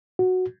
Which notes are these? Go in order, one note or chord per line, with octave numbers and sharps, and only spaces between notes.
F#4